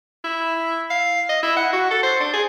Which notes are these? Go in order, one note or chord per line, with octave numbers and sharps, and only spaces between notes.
E4
F5
D#5
E4
F#5
F#4
A4
C5
D4
G#4